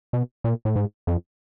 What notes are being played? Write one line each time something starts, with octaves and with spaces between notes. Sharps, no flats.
B2
A#2
A2
G#2
F2